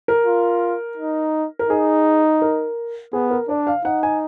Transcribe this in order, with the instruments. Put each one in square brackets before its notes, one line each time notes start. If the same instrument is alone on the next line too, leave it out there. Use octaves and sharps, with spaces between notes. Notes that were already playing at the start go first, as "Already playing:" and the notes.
[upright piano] A#4
[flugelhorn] F4
D#4
[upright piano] A#4
[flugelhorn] D#4 [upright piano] G#4
[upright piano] A#4
[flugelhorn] B3 [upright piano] G#4
[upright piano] A#4
[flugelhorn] D4 [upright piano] D5
[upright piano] F5
[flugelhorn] D#4 [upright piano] F#5
[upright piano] G#5